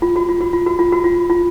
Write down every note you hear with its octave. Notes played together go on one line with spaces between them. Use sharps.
F4
F#4
F4
F#4
F4
F#4
F4
F#4
F4
F4